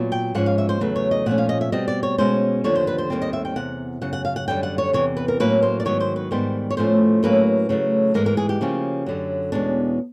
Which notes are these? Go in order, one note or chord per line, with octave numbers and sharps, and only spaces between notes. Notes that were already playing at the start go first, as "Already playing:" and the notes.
Already playing: A#2 F#3 B3
G5
G#2 F3 G#3 C#4 F#5
F5
E5
C5
E2 C#3 F#3 A3 B4
C#5
D#5
A#2 F3 A3 C#4 F#5
F5
D#5
E5
B2 G3 C4 D#5
D5
C#5
B2 G#3 C#4 C5
D#2 D3 F3 C#5
C5
B4
C5
D#2 D#3 G3 C4
D#5
E5
G5
E2 C3 F#5
F#2 C#3 F#5
F#5
F5
F#5
F#2 D3 G3 G5
F#5
C#5
E2 C3 E3 C#5
B4
A#4
A2 F#3 A#3 C#4 B4
C5
D5
G#2 D#3 F#3 B3 C#5
C5
B4
G#2 D#3 G3 B3 C5
C#5
A2 F3 A3 C#4 C5
A2 F#3 A#3 C#4 B4
C#3 F#3 A3
G#2 E3 G#3 B3 A#4
A#4
G#4
G4
C#3 F3 A#3 C#4
F#2 D3 F#3
E2 B2 G#3 C#4 D4